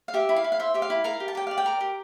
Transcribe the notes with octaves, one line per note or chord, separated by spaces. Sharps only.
F5
G4 E5
E4
F5
E4
F5
C5 E5
G4 E5
F5
E4
A#4 F5
G4
A5
G4 G5
D5 F5
G5
A#4
G4